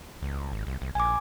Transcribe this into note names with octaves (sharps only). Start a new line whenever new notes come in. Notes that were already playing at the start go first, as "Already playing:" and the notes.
C#2
G#1
C2
C2
A#1 G#5 D6